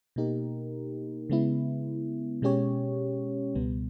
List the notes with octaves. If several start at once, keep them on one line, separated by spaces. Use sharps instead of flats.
B2 A#3 D#4 G4 A#4
C#3 G#3 B3 E4
B2 G#3 C#4 G4 C#5
C#2 B2 G3 B3